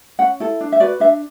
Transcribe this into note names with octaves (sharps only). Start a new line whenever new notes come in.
C#4 F#5
E4 A4
D4
E5
F#4 B4 D5
D4 E5